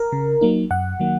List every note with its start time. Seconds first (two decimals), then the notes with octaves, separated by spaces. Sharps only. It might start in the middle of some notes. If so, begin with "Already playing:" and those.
Already playing: A#4
0.12 C#3
0.41 F#3 A#3 D#4
0.70 F#2 F#5
1.00 D#3 F#3 A#3